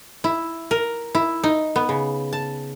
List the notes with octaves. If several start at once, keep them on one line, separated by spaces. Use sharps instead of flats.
E4
A#4
E4
D#4
B3
C#3
A5